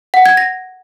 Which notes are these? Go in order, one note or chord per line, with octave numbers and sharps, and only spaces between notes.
F#5
G#6
A#6